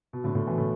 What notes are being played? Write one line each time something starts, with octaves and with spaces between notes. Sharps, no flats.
B2
A2 D3
A2 D3
B2 E3
A2 D3